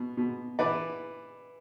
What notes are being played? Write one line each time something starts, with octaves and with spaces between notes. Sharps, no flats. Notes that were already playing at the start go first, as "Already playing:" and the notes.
Already playing: B2
B2
E3 B4 D5